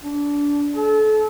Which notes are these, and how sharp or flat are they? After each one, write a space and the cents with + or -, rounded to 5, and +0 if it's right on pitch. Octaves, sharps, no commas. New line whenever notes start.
D4 -25
A4 -30